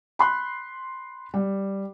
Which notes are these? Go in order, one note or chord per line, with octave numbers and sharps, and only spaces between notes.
B5 C6 F#6
G3